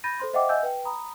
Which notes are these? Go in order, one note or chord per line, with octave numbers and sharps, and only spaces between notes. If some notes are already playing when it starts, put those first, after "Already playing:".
B5 G6 A6 A#6 D#7
A4 C5 C6
C5 D#5 E5 F#5 G5 D6
D#5 E5 F#5 G#5 E6 G6
B4 G5
A#5 B5 D#6